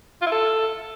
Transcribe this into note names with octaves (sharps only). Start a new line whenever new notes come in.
F4
E4
A4